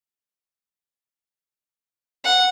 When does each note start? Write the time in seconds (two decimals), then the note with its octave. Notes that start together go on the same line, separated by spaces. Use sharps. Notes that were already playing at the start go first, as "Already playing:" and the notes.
2.24 F#5